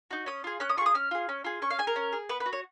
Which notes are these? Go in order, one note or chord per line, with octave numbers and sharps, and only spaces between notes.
D#4 F#4
C#4 D#6
F4 G#4
C#4 F#6
D#6
F4 G#4 C#6
D#6
C#4 F6
F4 G#4
C#4
F4 G#4
C#4 C#6
F5
G#4 G#5
A#4
C#4
G#4
B3 B4
B4
F#4
C#5